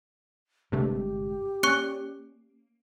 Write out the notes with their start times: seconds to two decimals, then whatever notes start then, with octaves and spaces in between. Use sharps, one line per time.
0.72 G1 G2 C3 G#3 A3 G4
1.63 A#3 C#4 D5 C#6 F#6 C#7